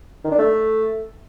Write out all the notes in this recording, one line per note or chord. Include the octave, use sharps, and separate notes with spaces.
D#3
D4
A3